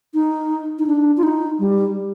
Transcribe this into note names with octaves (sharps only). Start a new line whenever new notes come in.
D#4
D#4
D4
F4
D#4
G3